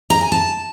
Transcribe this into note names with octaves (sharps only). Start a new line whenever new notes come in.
A#5
G#5
A5